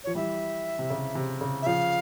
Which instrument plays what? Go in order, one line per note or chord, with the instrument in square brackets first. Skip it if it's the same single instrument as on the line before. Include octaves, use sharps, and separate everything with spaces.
[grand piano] F3 [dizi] C#5
[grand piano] E3 G3 [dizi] E5
[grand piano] C3
C#3
C3
C#3
[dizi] E5
[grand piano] C#3 F3 [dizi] F5